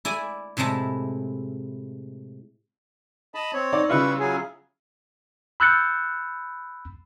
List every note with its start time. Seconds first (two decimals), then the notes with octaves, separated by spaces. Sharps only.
0.05 E4 D5 G#5
0.57 A2 C3 G#3 E4 A5
3.35 D#5 A5 B5
3.53 C4 C#5
3.73 D#4 D5
3.89 C#3 G3 E4 F4 B4 C#6
4.19 F#3 G#4
5.60 B5 E6 F#6 G6 A6 C#7